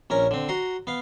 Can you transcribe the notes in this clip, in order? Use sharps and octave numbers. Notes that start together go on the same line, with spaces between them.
A#1 C#4 A#4 A#5
D3 C4
F#4 A#5 C6
B3 F5